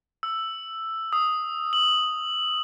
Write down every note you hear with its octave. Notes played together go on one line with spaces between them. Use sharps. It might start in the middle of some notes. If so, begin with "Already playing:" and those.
E6
D#6
F#7